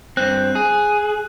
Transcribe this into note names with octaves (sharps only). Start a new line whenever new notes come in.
G2 C4 F#6
G#4